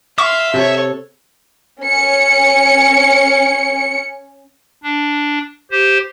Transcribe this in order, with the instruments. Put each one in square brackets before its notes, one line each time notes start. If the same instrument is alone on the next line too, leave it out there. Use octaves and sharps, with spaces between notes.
[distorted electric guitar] E5 [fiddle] F5 C6 [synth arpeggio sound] C#6
[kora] C3 [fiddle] A4 C#5
[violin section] C#4 C#7
[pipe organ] D4
G4 C5